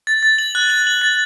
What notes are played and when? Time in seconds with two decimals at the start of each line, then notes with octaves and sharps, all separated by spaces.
0.07 A6
0.23 A6
0.38 F#7
0.55 F#6
0.70 F#7
0.87 F#7
1.02 A6